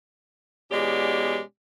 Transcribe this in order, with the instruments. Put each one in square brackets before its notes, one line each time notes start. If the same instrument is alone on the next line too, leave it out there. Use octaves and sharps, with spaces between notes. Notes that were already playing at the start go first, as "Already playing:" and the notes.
[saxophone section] E2 B2 G#3 C#4 G4 D5